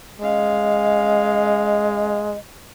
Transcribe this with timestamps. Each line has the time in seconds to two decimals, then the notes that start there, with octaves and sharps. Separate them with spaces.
0.20 G#3 C#4 D#5 F5